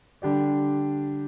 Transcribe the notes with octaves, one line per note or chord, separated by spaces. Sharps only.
D3 G3 D4 G4 D5